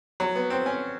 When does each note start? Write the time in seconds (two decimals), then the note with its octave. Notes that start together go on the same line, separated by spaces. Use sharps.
0.20 F#3
0.35 B3
0.50 C4
0.66 C#4